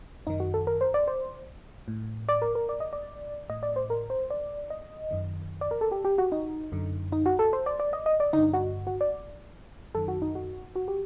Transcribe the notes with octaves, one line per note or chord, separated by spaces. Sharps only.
F#2 D#3 D#4
F#4
A4
A#4
C5
D5
C5
A2
D5
A#4
A#4
D5
D#5
D5
A2 D#5
D5
C5
A#4
C5
D5
D#5
F#2 D#3
D5
A#4
A4
G4
G4
F#4
D#4
F#2 D3
D#4
F#4
A4
C5
D5
D5
D#5
D#5
D5
G2 D3 D#4
F#4
F#4
D5
F#2 D#3 A4
F#4
D#4
F#4
F#4
G4